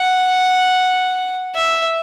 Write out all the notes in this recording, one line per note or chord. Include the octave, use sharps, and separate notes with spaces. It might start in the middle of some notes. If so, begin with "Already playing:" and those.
Already playing: F#5
E5